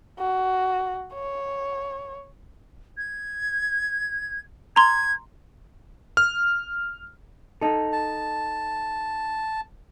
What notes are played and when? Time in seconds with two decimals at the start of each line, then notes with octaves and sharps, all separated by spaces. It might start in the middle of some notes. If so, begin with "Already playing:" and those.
0.19 F#4
1.14 C#5
2.98 G#6
4.76 A#5 C6 G#6
6.17 F6
7.61 D#4 A4
7.92 A5